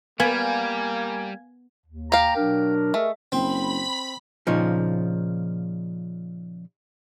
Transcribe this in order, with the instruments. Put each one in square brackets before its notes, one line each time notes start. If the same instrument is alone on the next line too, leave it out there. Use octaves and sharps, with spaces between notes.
[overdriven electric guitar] G3 [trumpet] A#3 [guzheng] B3 [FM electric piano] F5 G#5 G#6
[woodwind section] D#2
[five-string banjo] G4 F5 [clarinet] A#5
[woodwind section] B2 F#3 D4 [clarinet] A#4
[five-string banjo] A3 [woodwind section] G#4 D#5 E5
[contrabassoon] F#1 [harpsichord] C4 [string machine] B5 B6
[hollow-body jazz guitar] A#2 C#3 F3 D#4